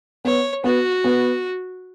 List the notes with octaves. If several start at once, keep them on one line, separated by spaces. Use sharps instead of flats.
B3 C#5
B3 F#4
B3